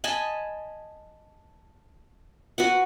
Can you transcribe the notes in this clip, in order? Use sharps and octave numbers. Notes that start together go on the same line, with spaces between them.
D#5 G#5 A5 B5
F#4 B4 F#5